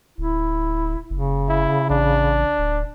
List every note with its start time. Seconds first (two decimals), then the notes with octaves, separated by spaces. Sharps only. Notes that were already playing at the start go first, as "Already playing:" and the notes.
0.18 D1 E4
1.10 F#1 C#3
1.49 E4
1.90 A1 D4
2.59 D1